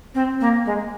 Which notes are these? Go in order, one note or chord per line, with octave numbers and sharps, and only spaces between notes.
C4
A#3
G#3